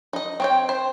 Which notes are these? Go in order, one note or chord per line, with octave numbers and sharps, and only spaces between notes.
D#4 D#5
C4 C#5 G5
C5